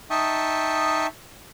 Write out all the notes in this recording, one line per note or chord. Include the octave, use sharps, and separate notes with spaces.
D#4 E5 G5 A5 C#6 D#6